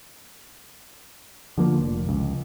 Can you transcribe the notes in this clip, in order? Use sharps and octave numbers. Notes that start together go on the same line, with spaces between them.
D3 F3 A#3
F1
C#2